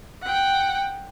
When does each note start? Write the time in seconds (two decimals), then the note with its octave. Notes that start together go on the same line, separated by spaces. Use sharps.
0.23 F#5 G5